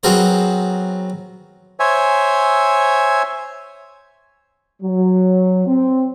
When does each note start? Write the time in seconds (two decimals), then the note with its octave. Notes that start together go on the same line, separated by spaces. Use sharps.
0.03 F#3 B3 C4 G#4 A#4 C5
1.80 C5 C#5 E5 G#5
4.83 F#3
5.67 C4